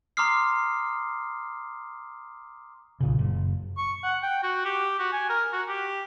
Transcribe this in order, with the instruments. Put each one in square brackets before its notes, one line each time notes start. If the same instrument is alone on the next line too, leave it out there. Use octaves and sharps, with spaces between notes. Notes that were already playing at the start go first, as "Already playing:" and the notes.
[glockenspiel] A#5 C6 D6 D#6 F6 C7
[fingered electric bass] B1 A#2 C#3
F#1
[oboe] C#6
F#5
G5
F#4
G4
F#4
G#5
A#4
F#4
G4